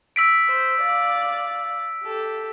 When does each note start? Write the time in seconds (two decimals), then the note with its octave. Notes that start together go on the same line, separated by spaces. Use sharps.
0.16 E6 B6 D7
0.48 C5
0.81 D5 F5
2.04 G4 A4